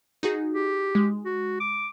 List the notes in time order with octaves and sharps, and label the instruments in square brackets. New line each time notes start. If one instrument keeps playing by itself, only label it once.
[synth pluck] D#4 F#4 G#4
[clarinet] G4
[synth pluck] G#3
[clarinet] F#4
D6